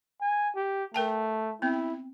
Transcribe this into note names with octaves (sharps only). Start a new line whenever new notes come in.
G#5
G4
A3 A#4 G5 A5
B3 C4 E4